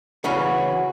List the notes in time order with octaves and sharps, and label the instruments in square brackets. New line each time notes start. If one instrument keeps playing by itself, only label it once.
[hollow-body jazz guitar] C#3 E3 C#4 [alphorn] F#4